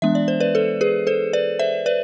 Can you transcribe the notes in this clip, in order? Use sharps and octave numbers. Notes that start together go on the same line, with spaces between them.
E3 G#3 B3 D4 E5
D5
C5
B4 D5
A4 C5
G#4 B4
A4 C5
B4 D5
C5 E5
B4 D5